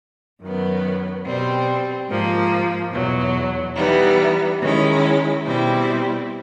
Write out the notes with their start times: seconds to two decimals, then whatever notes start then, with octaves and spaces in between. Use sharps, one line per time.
0.41 F#2 D#3 F#3 B3
1.25 B2 G3 C4
2.09 G#2 F3 A#3
2.93 E2 B2 F#3
3.77 E3 G3 B3 D#4
4.61 D#3 G#3 C#4 E4
5.44 B2 G3 C4 E4